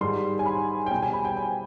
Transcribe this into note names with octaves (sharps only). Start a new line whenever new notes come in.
G#2 D#3 G3 C6
G#5
B5
G5
B2 G3 G#5
G#5
B5
G5
G5